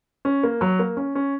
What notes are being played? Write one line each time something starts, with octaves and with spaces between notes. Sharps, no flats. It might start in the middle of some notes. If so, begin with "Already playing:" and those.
C#4
A#3
F#3
A#3
C#4
C#4